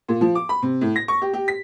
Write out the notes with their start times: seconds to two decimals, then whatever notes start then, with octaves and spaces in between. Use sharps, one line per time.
0.09 A#2
0.21 F3
0.35 D6
0.49 B5
0.63 C3
0.81 A2
0.96 A#6
1.08 C#6
1.22 G4
1.33 G4
1.48 B6